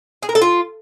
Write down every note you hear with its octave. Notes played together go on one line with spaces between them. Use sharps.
G#4
A#4
A4
F4